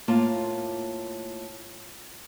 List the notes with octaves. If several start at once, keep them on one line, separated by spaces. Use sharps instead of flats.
A2 A#3 F4 A5